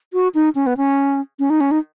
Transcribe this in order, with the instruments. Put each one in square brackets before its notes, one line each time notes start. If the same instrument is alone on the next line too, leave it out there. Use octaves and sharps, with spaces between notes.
[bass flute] F#4
D#4
C#4
B3
C#4
C#4
D#4
C#4
D#4